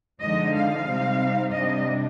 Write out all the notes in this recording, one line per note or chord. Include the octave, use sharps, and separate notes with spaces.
D3 F3 G#3 D#4 D#5
F5
C3 G3 C4 D#4
C3 G3 D4 D#5